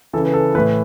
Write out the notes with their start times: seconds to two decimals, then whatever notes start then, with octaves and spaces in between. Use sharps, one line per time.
0.13 C#3 E3 A4
0.26 B4
0.34 A4
0.55 E3 B4
0.58 A2